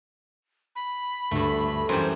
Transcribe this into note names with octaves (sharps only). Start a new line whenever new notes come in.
B5
D2 G2 A3
F#2 E3 G3 C5 C6